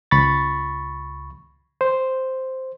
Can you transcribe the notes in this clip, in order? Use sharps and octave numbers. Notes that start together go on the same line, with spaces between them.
C#2 B5 C#6 A6
C5